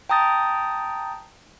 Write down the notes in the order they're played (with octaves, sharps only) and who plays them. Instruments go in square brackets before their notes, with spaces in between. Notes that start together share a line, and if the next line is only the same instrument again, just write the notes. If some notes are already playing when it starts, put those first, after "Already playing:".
[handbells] G5 A5 A#5 D#6 G6 A6